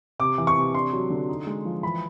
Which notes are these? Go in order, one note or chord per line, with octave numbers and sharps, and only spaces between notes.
C3 D6
E3
C#6
C3
D4 C6
F#3
D3
D#4
G#3
F3
E3 B5